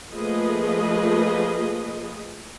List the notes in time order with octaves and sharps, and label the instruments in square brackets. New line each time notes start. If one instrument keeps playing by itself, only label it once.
[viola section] F3 A3 A#3 G#4 B4 D#5